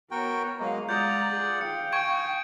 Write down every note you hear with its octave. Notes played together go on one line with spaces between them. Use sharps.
B3 F#4 A#4 C#5 G5
F#3 G#3 A#3 D#5 F5
G#3 F4 D5 F#5 A#5 D#6 G6
G#4
F5 G5 C#7
G#5 C#6 G#6 D7